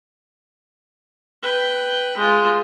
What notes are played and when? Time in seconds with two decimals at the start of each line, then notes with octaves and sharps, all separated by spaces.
1.43 B4 G5
2.17 G#3 F4